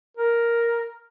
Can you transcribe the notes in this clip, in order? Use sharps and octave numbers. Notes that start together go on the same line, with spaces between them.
A#4